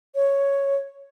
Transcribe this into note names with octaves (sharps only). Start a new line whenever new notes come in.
C#5